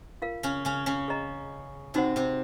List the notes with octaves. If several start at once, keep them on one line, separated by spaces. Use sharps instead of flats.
F4 A#4 F5
C#3 C#4
C#3 C#4
C#3 C#4
G#4 D#5 A#5
C3 C4 D#4 F#4 C5 F#5
C3 C4